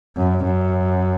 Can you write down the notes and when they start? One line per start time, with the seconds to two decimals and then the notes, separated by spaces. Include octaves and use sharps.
0.17 F#2
0.45 F#2